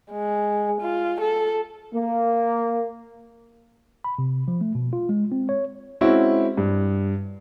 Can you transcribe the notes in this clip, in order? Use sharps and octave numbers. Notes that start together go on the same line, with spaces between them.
G#3
F4
A4
A#3
B5
C3
F3
A3
B2
F4
G#3
C4
C#5
G#3 C4 C#4 E4 F#4
G2